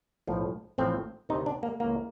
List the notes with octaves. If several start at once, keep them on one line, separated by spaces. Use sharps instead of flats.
B1 A2 F3
A1 A2 F3 C4
D2 C3 D#3 D#4
D4
A#3
C#2 C#3 E3 A#3